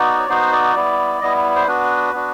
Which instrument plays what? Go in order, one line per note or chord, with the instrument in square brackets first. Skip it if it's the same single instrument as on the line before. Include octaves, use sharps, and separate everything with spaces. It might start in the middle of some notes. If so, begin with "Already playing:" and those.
Already playing: [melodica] B3 D#4 F#4 D5
C#5
B3 D#4 F#4 C5
D5
G3 B3 E4
G3 B3 E4 D#5
C5
B3 D4 F#4 B4
B3 D4 F#4